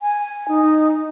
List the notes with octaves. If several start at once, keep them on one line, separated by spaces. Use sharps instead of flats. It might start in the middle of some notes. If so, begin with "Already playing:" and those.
G#5
D#4